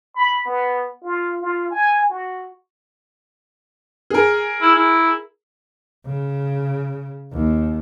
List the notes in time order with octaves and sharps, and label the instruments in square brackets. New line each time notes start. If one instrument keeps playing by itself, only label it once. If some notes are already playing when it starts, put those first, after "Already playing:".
[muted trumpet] B5
B3
F4
F4
G#5
F#4
[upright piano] G#4 A#4
[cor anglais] E4
E4
[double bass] C#3
D#2